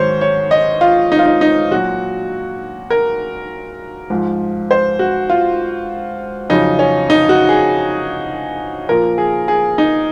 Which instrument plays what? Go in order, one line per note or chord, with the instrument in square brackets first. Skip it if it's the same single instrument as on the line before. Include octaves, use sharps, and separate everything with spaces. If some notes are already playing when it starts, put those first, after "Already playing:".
Already playing: [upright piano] G#2 D#3 F#3 C5 C#5
C#5
D#5
F4
D#4
F4
D#4
D#4
A#2 F#3 F#4
A#4
G#2 F3
C5
F#4
F4
F2 C#3 F#3 D#4
C#4
D#4
F#4
G#4
A#2 F3 A#4
G#4
G#4
D#4